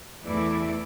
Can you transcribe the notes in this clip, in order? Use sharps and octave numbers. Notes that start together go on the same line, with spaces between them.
E2 E3 A3 E4 D5